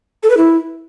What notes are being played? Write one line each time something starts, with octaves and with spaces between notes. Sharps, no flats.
A4
B4
E4